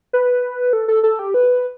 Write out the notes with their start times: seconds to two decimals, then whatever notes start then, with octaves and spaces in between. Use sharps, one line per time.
0.13 B4
0.73 A4
0.88 A4
1.03 A4
1.19 G4
1.34 B4